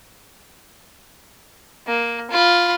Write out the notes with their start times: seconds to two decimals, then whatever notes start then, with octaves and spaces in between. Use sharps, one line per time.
1.87 A#3
2.31 F4 B5